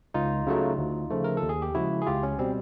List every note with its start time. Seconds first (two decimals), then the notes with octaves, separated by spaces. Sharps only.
0.14 C#2 D#4 F4
0.47 C#3 F#3 A3
0.78 D2
1.10 C#3 F3 A3
1.24 A#4
1.37 A4
1.43 D#2
1.49 G#4
1.62 G4
1.75 C#3 F3 G#3 E4 F#4
2.02 G#4
2.06 C#2 F4 G4
2.23 C#4
2.39 B2 G3 C4